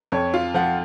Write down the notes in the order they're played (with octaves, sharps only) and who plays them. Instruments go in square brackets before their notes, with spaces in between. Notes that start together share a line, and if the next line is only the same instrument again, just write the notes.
[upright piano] F2 [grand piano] C#5
[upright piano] F4
[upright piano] F3 [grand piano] F#5